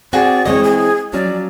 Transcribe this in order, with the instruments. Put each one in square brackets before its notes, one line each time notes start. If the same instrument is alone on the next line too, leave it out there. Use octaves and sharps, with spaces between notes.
[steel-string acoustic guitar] C4 [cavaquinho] F#4 G#4 [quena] D5
[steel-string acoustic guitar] E3 G#3 C4 [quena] C#5 [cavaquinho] D#5
[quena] G#4
[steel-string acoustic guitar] F3 F#3 C#4 [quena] D5